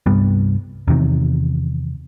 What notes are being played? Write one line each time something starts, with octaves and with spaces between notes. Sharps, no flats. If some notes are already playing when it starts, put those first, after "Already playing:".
C2 G2 G3 B3
E2 C3 D#3